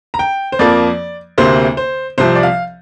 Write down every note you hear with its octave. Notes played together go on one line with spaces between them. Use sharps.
A#5
G5
C5
F2 F3 A#3 D5
D2 C3 A#3 C5
C5
C2 C3 F3 C5
D5
F5